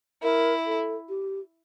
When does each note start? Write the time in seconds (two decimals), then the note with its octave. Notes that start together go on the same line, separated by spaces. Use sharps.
0.23 E4 A#4
0.66 A4
1.09 G4